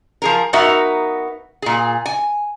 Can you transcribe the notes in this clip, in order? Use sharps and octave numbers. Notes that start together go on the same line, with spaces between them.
F3 G#4 A#4
B3 D#4 F#4 A#4 E5
A#2 G#4
G#5